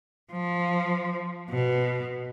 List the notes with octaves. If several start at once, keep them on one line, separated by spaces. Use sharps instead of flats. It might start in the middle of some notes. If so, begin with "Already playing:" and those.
F3
B2